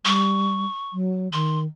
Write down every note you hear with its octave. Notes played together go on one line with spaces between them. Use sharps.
G3 C#6
F#3
D#3 C6